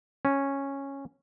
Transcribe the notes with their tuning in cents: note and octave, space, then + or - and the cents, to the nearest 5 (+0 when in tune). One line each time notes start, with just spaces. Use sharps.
C#4 -10